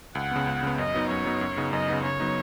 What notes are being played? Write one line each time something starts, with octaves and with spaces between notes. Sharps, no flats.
C#2 F#5
C#3 B3
C#2
C#3 B3
F#2 D#5
F#3 B3 D#4
F#2 C#5
F#3 B3 D#4
F#2
C#3 B3 D#4
F#2 D#5
C#3 B3 D#4
C#3 C#5
F#3 B3 D#4